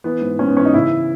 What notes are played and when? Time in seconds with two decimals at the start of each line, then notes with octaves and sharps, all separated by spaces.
0.04 E3 B3
0.22 G#2
0.39 G#2 C#4
0.48 B3
0.57 E3 C#4
0.65 D#4
0.74 C#3 E4